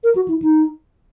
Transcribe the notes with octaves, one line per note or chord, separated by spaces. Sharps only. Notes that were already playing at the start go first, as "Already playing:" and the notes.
A#4
F#4
E4
D#4